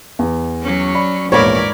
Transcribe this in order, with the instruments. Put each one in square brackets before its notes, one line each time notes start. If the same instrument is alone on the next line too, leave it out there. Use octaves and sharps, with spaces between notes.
[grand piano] E2
[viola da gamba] F#3 C#4
[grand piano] D5 B5
[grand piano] A#1 E2 [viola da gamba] G#2 A#4 D5 [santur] C#5 B5